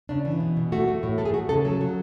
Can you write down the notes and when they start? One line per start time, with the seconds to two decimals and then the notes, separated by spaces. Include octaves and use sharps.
0.09 C#3 D4
0.25 E3
0.40 B2
0.57 B2
0.72 A3 F#4
0.88 A3
1.03 A2
1.18 A3 A4
1.25 G#4
1.34 A3 F#4
1.49 C#3 A4
1.65 F#3 A4
1.81 F#3